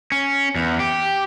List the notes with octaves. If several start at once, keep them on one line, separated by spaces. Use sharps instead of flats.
C#4
E2
G4